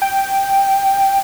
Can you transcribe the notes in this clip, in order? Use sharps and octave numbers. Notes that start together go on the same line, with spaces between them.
G5